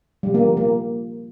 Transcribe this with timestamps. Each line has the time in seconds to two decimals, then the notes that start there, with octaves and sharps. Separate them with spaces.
0.23 G3
0.34 A#3
0.46 F3
0.57 A#3